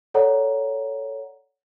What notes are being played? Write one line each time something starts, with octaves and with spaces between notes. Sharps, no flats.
A4 C#5 D5 F#5 A#5